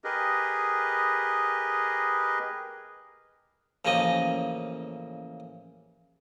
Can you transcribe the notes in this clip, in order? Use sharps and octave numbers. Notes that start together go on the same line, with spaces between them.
G4 G#4 A#4 B4 D#5
A1 C#3 F3 A#3 D#5